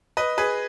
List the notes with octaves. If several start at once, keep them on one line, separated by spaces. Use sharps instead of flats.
B4 D#5
G#4 B4